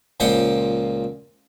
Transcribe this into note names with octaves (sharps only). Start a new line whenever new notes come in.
C#2 A#2 F3 C5 F#5 G5